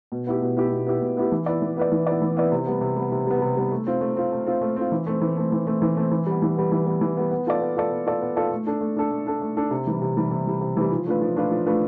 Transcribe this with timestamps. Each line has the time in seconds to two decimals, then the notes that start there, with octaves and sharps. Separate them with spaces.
0.12 B2
0.27 B3 E4 G4
0.42 B2
0.57 B3 E4 G4
0.72 B2
0.87 B3 E4 G4
1.02 B2
1.17 B3 E4 G4
1.32 E3
1.46 B3 E4 B4 D5
1.62 E3
1.77 B3 E4 B4 D5
1.92 E3
2.07 B3 E4 B4 D5
2.22 E3
2.37 B3 E4 B4 D5
2.52 C3
2.67 G3 B3
2.81 C3
2.96 G3 B3
3.12 C3
3.27 G3 B3
3.42 C3
3.57 G3 B3
3.72 A3
3.87 C4 F4
4.01 A3
4.16 C4 F4
4.32 A3
4.46 C4 F4
4.61 A3
4.76 C4 F4
4.92 E3
5.06 A3 C4
5.21 E3
5.37 A3 C4
5.52 E3
5.67 A3 C4
5.82 E3
5.97 A3 C4
6.11 E3
6.26 G3 B3
6.42 E3
6.57 G3 B3
6.72 E3
6.86 G3 B3
7.01 E3
7.17 G3 B3
7.31 B3
7.47 F4 A4 D5
7.61 B3
7.76 F4 A4 D5
7.91 B3
8.06 F4 A4 D5
8.22 B3
8.36 F4 A4 D5
8.52 A3
8.67 D4 A4
8.81 A3
8.97 D4 A4
9.11 A3
9.26 D4 A4
9.42 A3
9.57 D4 A4
9.71 C3
9.87 E3 G3
10.02 C3
10.17 E3 G3
10.31 C3
10.47 E3 G3
10.61 C3
10.77 E3 G3
10.92 F3
11.06 A3 D4 F4 B4
11.22 F3
11.36 A3 D4 F4 B4
11.51 F3
11.66 A3 D4 F4 B4